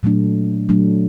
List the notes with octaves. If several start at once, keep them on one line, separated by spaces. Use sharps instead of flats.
A#2 F#3 A3 D4
A#2 F#3 A3 D4